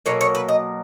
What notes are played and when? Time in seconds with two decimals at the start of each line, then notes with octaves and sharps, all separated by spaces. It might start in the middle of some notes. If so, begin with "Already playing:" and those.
0.06 B2 F#3 A#3 C#5
0.21 C#5
0.35 B4
0.49 D#5